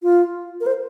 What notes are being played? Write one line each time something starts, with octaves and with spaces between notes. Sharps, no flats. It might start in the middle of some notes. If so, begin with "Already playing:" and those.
F4
A#4
C5